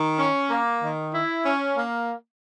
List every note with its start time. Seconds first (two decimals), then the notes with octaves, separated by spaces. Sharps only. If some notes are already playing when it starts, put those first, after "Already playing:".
Already playing: D#3
0.19 C#4
0.50 A#3
0.82 D#3
1.13 E4
1.45 C#4
1.76 A#3